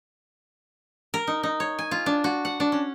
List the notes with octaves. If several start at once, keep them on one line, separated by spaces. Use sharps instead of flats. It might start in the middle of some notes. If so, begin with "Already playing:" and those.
A#4
D#4
D#4
C#5
G#5
F4
D4
F#4
F#5
D4
C#4